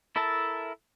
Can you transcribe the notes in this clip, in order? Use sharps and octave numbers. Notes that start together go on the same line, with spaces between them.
E4 A4 A#4 E5 A5